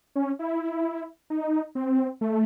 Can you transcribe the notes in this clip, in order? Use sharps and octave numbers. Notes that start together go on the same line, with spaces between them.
C#4
E4
D#4
C4
A3